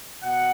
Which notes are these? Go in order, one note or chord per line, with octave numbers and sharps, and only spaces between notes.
B2 F#5